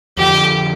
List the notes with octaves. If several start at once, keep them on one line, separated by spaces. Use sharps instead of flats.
F2 D3 F3 G4